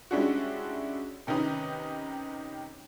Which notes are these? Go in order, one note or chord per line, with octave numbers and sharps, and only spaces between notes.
G3 G#3 C#4 D4 E4 F#4
C3 D#3 C#4 D#4 B4